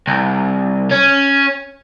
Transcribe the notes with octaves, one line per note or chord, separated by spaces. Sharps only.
C2
C#4